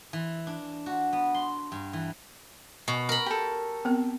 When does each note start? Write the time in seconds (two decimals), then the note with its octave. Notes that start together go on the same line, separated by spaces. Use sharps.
0.13 E3
0.47 D4
0.86 F#4
1.13 B3
1.34 C6
1.72 G2
1.93 E3
2.88 B2
3.09 A#4 B5
3.26 G4 A4
3.85 B3 C4 A#4